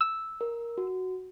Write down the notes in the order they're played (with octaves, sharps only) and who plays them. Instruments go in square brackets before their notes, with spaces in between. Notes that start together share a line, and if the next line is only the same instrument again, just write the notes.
[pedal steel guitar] E6
[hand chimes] A#4
F#4